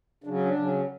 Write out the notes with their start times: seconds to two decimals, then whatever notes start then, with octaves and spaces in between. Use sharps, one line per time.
0.24 C#3 F#3 C#4 D4
0.45 D4
0.55 C#3 F#3 C#4